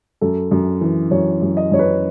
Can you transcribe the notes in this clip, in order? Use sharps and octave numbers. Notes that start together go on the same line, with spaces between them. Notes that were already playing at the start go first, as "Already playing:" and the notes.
F#2 A4
F#2
E3
F#2 C#5
F#2
D#5
F#2 C#5
B4